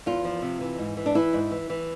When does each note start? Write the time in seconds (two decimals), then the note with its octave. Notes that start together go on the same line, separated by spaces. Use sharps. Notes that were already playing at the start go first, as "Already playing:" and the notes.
0.06 E2 F4
0.24 F3
0.42 C3
0.61 E3
0.78 G#2
0.97 E3
1.06 D4
1.15 E3 E4
1.33 G#2
1.51 E3
1.70 E3